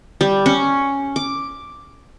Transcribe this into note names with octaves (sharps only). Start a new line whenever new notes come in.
G3
C#4
D6